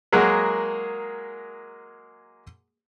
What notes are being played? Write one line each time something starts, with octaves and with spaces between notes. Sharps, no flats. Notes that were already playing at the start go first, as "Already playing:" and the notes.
F#3 G#3 A#3 G#4 A#4